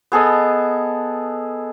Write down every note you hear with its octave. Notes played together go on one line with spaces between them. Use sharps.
B3 G#4 A4 D#5